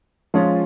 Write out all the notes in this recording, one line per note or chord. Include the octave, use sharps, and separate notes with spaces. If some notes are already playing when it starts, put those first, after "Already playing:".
F3 G#3 C#4 F4